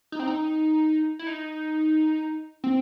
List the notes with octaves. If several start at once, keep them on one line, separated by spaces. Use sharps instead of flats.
D#4
C4
D#4
E4
D#4
C4